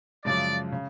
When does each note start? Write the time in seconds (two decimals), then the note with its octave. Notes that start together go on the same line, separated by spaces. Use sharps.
0.25 F#2 C#3 F3 G#3 D5
0.72 C#3